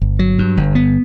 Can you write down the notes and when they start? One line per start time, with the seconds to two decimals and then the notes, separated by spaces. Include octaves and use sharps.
0.01 G1
0.19 F#3
0.39 G2
0.57 G1
0.75 B3